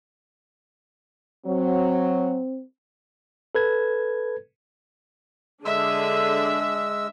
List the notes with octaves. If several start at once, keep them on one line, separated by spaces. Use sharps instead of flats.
F#3 C4
A4 B4 G#6
D3 G#3 D4 G#4 E5 E6